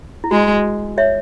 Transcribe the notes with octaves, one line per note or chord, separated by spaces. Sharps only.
E4
G#3 F#4
C#5 E5